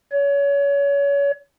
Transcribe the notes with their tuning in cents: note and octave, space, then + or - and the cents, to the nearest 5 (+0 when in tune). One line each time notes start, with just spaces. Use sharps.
C#5 +30